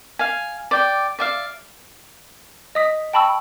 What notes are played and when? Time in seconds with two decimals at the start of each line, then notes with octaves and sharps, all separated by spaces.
0.19 F5 G#5
0.71 D5 G5
1.19 D5 E5 F5
2.75 D#5 D#6 B6
3.13 G5 A5 B5 C#6 E6